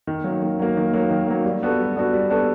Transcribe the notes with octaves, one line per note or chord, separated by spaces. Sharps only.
D#3
F#3 A#3
D#3
F#3 A#3
D#3
F#3 A#3
D#3
F#3 A#3
G3
B3 D4 F#4 A4
G3
B3 D4 F#4 A4
G3
B3 D4 F#4 A4